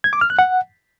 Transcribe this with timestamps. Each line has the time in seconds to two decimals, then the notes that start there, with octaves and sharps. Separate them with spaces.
0.04 G#6
0.13 D6
0.21 F6
0.30 F#6
0.39 F#5